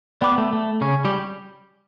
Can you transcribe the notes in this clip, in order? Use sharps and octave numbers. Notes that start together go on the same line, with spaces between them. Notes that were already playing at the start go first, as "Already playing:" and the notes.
B3 D5 G5 B5 D6 F#6
A3
A3
C#3 C#4
G3 G4